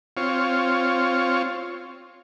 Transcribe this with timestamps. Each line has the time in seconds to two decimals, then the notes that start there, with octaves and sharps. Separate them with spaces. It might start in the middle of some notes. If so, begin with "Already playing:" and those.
0.17 C4 F4 C#5